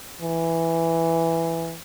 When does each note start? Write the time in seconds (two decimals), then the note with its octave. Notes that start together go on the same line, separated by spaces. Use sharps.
0.22 E3